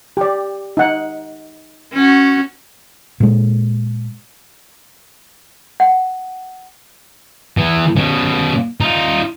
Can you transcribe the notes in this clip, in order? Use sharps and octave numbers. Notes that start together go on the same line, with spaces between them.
G4 D5
D#4 F#5
C#4 F#4
A#2 G#3
F#5
E3 B3
B2 C#4
D#4 F4